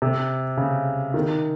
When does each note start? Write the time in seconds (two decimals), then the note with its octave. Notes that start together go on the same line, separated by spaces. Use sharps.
0.02 C3
0.57 C#3
1.14 D#3